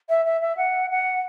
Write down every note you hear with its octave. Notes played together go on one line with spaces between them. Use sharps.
E5
E5
E5
F#5
F#5